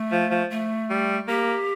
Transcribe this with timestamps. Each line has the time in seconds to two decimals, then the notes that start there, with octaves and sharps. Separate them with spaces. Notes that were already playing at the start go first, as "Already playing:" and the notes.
Already playing: A3
0.12 F3
0.31 F3
0.51 A3
0.90 G3
1.28 A#3 G4